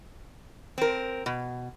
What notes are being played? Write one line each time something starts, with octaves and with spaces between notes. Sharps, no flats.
C4 A#4
B2